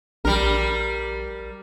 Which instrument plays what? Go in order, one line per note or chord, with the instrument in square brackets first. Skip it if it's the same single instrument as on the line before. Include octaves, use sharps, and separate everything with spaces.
[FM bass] A#1 [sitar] G3 A#4